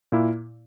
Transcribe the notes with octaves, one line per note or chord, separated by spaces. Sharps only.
A#2 A#3 E4